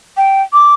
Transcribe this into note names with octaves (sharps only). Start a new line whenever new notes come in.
G5
D6